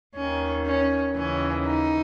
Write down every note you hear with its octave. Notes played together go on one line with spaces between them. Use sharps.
D#2 D#3 C#4
C#4
D#2 C#3 E3 C#4
D#4